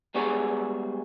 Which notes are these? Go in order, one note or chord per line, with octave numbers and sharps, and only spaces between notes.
G3 G#3 B3 F#4 G#4 C#5